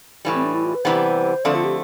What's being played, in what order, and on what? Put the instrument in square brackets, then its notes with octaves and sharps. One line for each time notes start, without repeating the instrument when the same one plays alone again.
[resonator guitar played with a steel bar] A2 E3 G3
[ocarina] C4
D4
E4
F4
B4
[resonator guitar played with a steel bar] C3 E3 G3 B3 [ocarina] C5
[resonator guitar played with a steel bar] D3 F3 A3 C4 [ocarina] D5
[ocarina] F4
G4